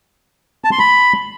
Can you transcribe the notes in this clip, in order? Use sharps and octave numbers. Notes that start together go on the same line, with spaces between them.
A5
C6
B5